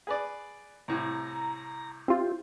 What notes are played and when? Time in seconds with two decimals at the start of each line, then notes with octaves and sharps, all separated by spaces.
0.07 G#4 B4 D5
0.88 C2 A2 A#5
2.08 C4 E4 F4 G4